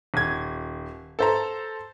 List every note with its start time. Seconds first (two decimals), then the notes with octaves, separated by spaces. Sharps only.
0.14 D#1 G#6
1.19 A4 C5 A#5